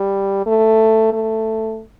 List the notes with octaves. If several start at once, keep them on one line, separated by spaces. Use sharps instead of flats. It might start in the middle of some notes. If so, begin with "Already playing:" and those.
Already playing: G3
A3
A3